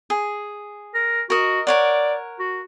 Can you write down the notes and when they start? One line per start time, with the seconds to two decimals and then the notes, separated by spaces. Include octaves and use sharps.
0.10 G#4
0.94 A#4
1.30 F#4 A#4 D#5
1.67 A#4 C#5 D5 F#5
2.39 F#4